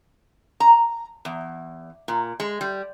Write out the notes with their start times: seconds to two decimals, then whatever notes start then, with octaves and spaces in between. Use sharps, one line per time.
0.60 A#5
1.25 E2
2.08 A#2
2.40 G#3
2.61 G3